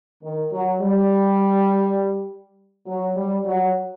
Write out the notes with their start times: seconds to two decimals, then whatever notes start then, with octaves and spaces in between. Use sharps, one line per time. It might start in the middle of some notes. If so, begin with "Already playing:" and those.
0.23 D#3
0.52 F#3
0.81 G3
2.86 F#3
3.16 G3
3.45 F#3